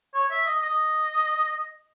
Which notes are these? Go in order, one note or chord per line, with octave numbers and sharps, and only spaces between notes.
C#5
E5
D#5
D#5